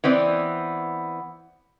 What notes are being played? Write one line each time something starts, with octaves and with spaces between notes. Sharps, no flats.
E3 B3 C4 D5